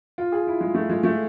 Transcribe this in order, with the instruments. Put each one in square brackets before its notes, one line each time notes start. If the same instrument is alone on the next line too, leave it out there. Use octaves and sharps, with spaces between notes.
[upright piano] F4
G#4
E4
G#3
A3
G#3
A3